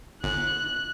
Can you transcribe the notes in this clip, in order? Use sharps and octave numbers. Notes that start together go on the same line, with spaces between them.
G1 F#6